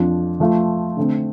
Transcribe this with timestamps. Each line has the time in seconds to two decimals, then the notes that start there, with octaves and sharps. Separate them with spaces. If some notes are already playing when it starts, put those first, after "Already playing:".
Already playing: F2 F3 D4 F4
0.40 F3 A3 F4
0.97 D3 A3 C4